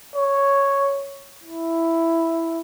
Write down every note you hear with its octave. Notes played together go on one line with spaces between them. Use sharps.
C#5
E4